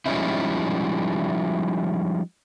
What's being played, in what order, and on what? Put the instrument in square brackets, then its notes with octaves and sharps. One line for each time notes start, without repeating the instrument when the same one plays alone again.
[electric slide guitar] F3 G3 G#3 C#4 D#4 E4